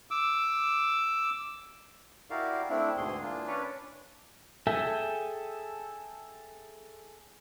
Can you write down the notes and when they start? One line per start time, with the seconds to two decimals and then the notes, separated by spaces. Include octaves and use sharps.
0.11 D6 E6
2.30 E4 F#4 G4 A#4 D5 F5
2.70 A3 C4 D4 E4
2.97 D2 G#2 B2 G#4 C6
3.22 E3 A#3 D4 F4
3.47 C#4 D4 B4 C#5 D5
4.67 G#4 A4 E5 G5 G#5